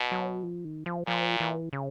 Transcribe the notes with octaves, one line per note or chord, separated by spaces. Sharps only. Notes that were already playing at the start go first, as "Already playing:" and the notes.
Already playing: B2
F#3
F3
D#3
F3
A#2 F3
E3
C#3